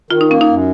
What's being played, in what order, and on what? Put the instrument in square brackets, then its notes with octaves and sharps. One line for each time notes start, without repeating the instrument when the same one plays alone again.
[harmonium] D#3 [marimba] F4
[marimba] D#4
[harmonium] A#3 [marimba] C#4
[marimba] D#4
[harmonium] F#2